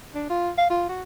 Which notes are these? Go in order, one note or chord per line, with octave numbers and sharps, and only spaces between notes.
D4
F4
F5
F4
F#4